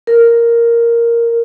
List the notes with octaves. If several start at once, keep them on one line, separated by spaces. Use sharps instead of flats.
A#4